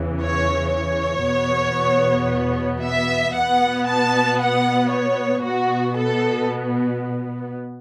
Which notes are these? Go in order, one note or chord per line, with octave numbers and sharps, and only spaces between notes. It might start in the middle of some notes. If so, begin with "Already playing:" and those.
Already playing: E2 C#3 E3
C#5
C#5
E2 B2 B3
E5
B2 B3 F#5
A5
F#5
C#5
B2 B3 F#4
A4